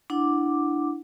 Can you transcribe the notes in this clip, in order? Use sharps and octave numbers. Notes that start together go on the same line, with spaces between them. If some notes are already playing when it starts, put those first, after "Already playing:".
D4 E4 F#5 D6